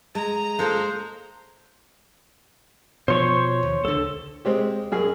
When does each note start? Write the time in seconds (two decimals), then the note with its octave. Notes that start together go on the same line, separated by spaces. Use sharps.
0.15 G#3 A#5
0.59 G#3 A#3 F4 A4 C5
3.08 B2 F3 C5 C#5 C#6
3.63 D#2
3.85 C#2 D3 A4
4.45 G#3 C4 G4
4.92 F#2 G#4